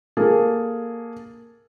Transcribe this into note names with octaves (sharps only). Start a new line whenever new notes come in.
A#3 G#4 A4